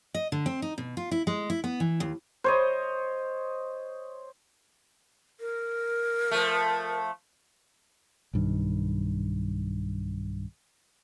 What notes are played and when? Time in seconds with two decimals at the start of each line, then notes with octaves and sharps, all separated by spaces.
0.14 D#5
0.32 D3
0.46 C4
0.62 D#4
0.78 B2
0.97 F4
1.11 E4
1.27 G#3
1.50 E4
1.64 B3
1.80 E3
2.00 D#2
2.44 C5 C#5 D#5
5.40 A#4
6.31 F3 A3
8.34 B1 G2 D#3